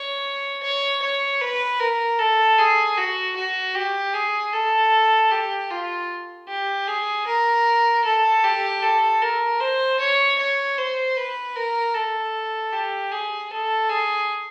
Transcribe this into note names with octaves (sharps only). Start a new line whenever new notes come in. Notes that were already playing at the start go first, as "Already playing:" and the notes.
Already playing: C#5
C#5
C#5
B4
A#4
A4
G#4
F#4
F#4
G4
G#4
A4
G4
F4
G4
G#4
A#4
A4
G4
A4
A#4
C5
C#5
C#5
C5
B4
A#4
A4
G4
G#4
A4
G#4